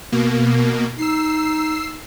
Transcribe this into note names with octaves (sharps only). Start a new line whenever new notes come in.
B2 A#3
D#4 E6 C7